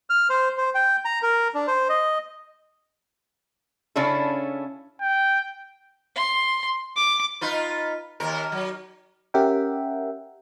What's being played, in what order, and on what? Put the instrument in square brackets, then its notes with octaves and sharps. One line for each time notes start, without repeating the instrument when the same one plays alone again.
[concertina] F6
C5
C5
G5
A#5
A#4
D4
C5
D#5
[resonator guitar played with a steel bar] C#3 C#4 D4 E4 A4
[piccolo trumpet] G5
[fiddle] C6
D6
[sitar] D#4 F4 B4
D#2 A#4
F#3
[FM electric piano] C#4 G4 A#4 E5 F#5 G5